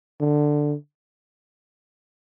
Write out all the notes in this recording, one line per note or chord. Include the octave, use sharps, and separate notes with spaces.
D3